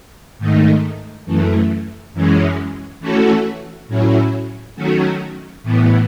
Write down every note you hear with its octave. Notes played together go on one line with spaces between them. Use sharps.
G#2 D#3 A3 D#4
F#2 E3 A3
F#2 E3 G#3 C#4
E3 A3 C#4 F#4 A4
A2 F#3 C#4 E4
D#3 F#3 A3 C#4 F#4
A2 E3 B3